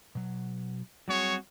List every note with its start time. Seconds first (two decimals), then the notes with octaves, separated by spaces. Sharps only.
0.15 B2 F#3
1.08 F#3 G3 C4 F#4 G#4 C#5